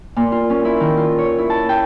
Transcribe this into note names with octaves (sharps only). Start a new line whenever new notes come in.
A#2
F4
C#4
E4
D#3
F4
C#5
E4
A5
G5